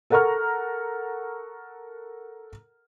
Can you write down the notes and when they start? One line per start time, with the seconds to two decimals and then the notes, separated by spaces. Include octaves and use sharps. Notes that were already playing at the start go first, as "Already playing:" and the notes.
0.10 A4 A#4 F#5 A#5 C#6 F6